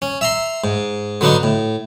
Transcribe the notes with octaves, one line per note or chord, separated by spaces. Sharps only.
C#4
E5 A#5 C6
G#2
D3 F#3 B3 D4 D#4
A2